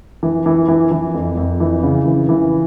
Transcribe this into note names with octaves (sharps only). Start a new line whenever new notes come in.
E3
E3
E3
E3
F2
F2
E3
C#3
E3
E3